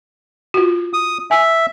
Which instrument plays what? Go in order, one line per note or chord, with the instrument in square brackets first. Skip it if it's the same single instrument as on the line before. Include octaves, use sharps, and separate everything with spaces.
[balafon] F4 F#4
[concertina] D#6
[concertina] E5 [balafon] G#5